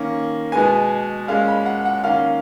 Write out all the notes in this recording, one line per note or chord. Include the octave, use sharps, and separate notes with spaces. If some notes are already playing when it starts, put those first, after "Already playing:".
Already playing: D#3 A#3 C#4
B2 G#3 B3 G#5
A#2 G#3 C#4 F5
B5
F#5
F#5
D#3 A#3 C#4 F5